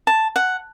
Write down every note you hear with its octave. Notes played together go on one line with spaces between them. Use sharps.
A5
F#5